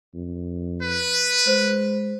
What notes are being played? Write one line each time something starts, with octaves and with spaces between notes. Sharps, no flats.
F2
B4
G#3 C5